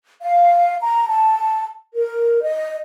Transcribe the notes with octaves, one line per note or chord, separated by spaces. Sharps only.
F5
A#5
A5
A#4
D#5